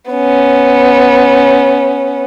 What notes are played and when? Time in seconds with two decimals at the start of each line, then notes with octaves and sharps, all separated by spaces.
0.11 B3 C#4